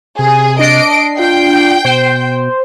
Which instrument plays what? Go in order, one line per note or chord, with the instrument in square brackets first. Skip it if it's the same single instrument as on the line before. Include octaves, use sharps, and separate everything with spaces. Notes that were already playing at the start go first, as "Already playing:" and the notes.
[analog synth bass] C3 [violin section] G#4
[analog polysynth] D4 C7 [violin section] D#5 D7
[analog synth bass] F4 [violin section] G5
[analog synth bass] B2 [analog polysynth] C5